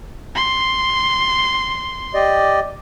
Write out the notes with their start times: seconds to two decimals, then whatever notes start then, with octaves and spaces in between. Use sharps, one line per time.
0.35 C6
2.15 G4 D5 D#5